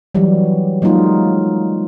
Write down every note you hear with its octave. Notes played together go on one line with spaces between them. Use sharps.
E3 F#3 G3
F#3 G#3 A#3 D#4 F4